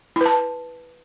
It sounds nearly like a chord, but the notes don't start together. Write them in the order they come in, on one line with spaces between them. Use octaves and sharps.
E4 B4 A5